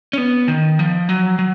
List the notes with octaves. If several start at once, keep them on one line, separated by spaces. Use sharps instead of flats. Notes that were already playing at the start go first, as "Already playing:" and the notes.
C#4
B3
D#3
F3
F#3
F#3